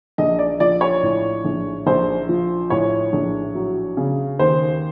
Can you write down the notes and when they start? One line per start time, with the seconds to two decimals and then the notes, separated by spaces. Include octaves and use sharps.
0.18 A#1 D#5
0.39 D5
0.60 F3 D5
0.81 C#5
1.03 A2
1.45 A#1
1.87 A#1 C5
2.29 F3
2.70 A2 C#5
3.13 A#1
3.55 F#3
3.97 C#3
4.39 D#2 C5